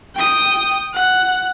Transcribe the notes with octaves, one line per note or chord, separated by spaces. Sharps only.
G5 D#6
F#5